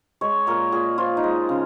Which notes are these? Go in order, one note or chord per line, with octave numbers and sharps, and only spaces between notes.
G#3 C#5
A#2 A#4
A#2 G#4
F3 F4
D#4
G#3
C#3